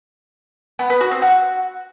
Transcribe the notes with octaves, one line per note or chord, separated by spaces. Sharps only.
B3
B3
F#4
C4
F#4